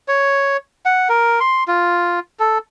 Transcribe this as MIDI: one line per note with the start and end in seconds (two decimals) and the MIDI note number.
0.08 0.57 73
0.86 1.08 78
1.09 1.40 70
1.40 1.64 84
1.68 2.19 65
2.40 2.58 69